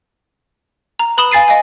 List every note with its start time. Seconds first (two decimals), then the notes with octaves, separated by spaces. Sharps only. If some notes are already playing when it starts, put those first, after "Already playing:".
0.99 A#5
1.17 B4 B5 D#6 E7 G7
1.31 F5 G#5 A6 C7 D#7
1.48 D#5 F5 G#5